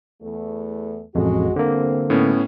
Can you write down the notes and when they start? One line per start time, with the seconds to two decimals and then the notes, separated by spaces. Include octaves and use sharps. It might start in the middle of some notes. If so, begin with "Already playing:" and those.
0.22 E2 A3
1.15 A1 F2 G#3 F#4
1.56 E2 G2 D3 A#3 C4
2.10 A2 B3 C#4